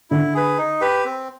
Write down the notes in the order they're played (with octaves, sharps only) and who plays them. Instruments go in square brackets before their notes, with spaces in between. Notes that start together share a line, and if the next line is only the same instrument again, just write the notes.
[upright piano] D3 [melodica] E4
[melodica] G#4 B4
D#4
G4 B4
C4